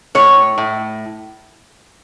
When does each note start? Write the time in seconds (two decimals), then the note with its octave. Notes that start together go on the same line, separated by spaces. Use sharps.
0.15 A2 C#5
0.58 A2